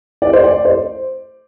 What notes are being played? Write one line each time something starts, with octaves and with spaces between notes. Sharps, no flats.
D5
C5
D5
C5